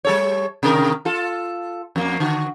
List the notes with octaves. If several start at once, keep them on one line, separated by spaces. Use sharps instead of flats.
G3 A4 C#5
C3 D#3 A#4
F4 A4
F2 A#3
D3 F#4